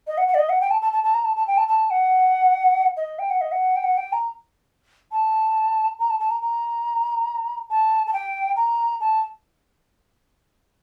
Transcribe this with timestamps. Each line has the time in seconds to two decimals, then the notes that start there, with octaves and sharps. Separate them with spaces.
0.07 D#5
0.17 F#5
0.28 F#5
0.34 D5
0.39 D#5
0.49 F#5
0.61 G5
0.71 A5
0.82 A5
0.93 A5
1.03 A5
1.14 A#5
1.24 A5
1.36 A5
1.47 G5
1.57 A5
1.68 A5
1.90 F#5
2.97 D#5
3.19 G5
3.30 F#5
3.41 D#5
3.52 F#5
3.76 G5
3.83 F#5
3.97 G5
4.13 A#5
5.12 A5
5.99 A#5
6.10 A5
6.20 A5
6.30 A#5
6.42 A#5
7.70 A5
8.07 A5
8.13 G5
8.56 A#5
9.00 A5